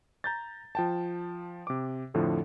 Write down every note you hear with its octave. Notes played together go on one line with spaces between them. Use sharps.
A#5 G6 A6
F3 G5 A5
C3 D6
F2 A2 D3 F3